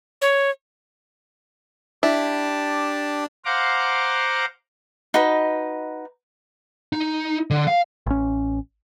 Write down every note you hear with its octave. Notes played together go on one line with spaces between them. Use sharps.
C#5
D4 E4 G4 A5 D6
C5 F5 F#5 A#5 D6
D#4 F#4 B4 D#5
D#4
D3
F5
A1 C#4